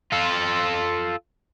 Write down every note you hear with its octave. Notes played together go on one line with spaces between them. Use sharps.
F4 A4